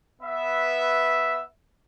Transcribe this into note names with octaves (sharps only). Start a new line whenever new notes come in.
B3 B4 E5